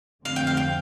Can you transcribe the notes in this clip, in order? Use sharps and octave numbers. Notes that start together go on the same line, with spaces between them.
F2 D3 A3 C4 F5
G5
F5
G5